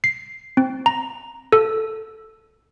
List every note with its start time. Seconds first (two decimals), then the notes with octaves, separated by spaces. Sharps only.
0.04 C7
0.57 C4
0.86 A#5
1.52 A4